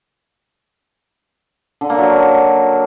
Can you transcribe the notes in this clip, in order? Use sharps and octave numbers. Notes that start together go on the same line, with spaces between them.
D3
A#3
F#3